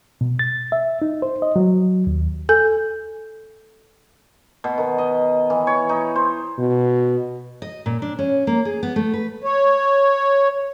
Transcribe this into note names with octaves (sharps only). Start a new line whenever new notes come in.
B2
A6
E5
D#4
C5
D#5
F#3
D#2
A4 G#5 G6
B2
D#3
D#5
E3
C#5
D#4
C5
B2
D#5
A#2
D4
C#4
A#3
G#4
B3
A3
B4
C#5